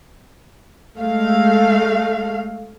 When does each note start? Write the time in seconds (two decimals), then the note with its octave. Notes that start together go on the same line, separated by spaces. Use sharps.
1.00 G#3 A3 F5